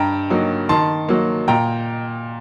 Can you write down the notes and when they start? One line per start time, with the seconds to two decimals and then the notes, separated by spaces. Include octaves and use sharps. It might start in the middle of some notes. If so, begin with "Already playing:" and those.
Already playing: G2 G5 A#5
0.30 F#3 A#3 D#4
0.69 D#3 A5 C6
1.09 F#3 A#3
1.48 A#2 G5 A#5